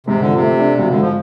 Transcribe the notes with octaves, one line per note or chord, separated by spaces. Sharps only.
G#2 C3
D3 F3
C3
A3
D4
G#1 C3
D3
G#2
F3